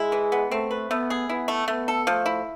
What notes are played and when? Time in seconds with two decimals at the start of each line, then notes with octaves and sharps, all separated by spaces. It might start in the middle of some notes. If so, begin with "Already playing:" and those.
Already playing: G#3 E4
0.12 E3
0.32 B3
0.51 A3 C4
0.71 B4
0.90 A3 B3
1.10 G#4
1.29 B3 E4
1.48 A3
1.68 A3 B3
1.88 A4
2.07 F3 A3
2.26 E4